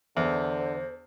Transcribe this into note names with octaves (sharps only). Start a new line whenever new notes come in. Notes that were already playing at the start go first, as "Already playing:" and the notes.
E2 D3 C5